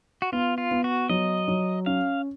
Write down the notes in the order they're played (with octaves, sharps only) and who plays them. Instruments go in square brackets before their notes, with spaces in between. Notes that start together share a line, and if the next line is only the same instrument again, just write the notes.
[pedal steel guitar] F#4
[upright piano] B3 [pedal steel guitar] F4
[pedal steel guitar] F4
[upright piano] B3
[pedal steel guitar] F#4
[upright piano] F#3 [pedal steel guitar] D#5
[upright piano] F#3
[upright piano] C#4 [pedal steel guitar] F5